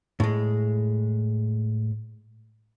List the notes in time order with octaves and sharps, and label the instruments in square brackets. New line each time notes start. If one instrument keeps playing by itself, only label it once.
[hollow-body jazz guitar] A2 G#3